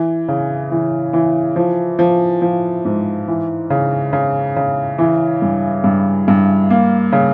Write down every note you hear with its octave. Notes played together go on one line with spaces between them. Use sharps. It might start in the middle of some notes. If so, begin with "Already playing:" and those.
Already playing: E3
C#3
E3
E3
F3
F3
F3
G#2
E3
C#3
C#3
C#3
E3
G2
G2
G2
A#3
C#3